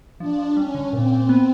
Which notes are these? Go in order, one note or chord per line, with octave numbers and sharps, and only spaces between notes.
F3 D4
F3
G3 C#4
D3
A#2 C4
A#2
B3